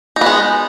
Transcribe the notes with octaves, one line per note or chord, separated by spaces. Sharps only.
G#3 B3 D#4